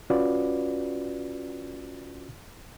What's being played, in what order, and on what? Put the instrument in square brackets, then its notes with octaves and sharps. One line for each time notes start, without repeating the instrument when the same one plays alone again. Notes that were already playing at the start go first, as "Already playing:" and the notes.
[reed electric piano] C#4 F4 F#4 B4 D5